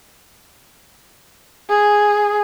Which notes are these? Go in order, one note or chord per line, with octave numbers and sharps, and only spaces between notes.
G#4